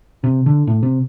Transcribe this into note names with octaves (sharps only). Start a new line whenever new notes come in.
C3
D3
A2
C3